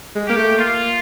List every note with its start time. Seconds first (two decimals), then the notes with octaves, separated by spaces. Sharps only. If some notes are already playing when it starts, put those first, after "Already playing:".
0.16 G#3
0.27 A#3 G4
0.36 A3
0.58 A#3 F4